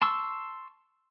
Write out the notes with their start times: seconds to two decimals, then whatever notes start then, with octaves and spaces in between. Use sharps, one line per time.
0.02 A5 C6 C#6 E6